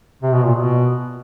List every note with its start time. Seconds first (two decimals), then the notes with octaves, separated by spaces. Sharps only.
0.22 C3
0.34 B2
0.44 A#2
0.55 B2